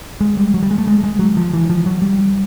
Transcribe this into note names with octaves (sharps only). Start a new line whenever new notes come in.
G#3
G3
F#3
G3
G#3
A3
G#3
G#3
F#3
F3
E3
F3
F#3
G3